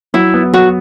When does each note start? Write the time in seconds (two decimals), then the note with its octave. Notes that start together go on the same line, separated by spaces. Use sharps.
0.14 F#3 E4
0.34 B3
0.53 F#3 F#4